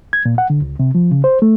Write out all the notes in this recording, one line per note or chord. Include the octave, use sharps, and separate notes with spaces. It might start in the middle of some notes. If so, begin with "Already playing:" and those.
G#6
A#2
F#5
D3
C#2
C3
F3
C#3
C5
A3